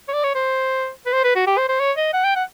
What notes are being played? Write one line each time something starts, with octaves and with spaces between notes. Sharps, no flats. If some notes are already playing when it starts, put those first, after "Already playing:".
C#5
D5
C#5
C5
B4
C5
B4
F#4
G4
C5
C5
C#5
D#5
F#5
G5
F#5